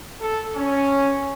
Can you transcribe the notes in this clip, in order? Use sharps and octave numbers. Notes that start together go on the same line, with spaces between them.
A4
C#4